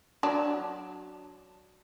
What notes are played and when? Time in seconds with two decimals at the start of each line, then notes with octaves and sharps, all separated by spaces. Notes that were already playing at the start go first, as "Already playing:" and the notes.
0.23 F#3 D4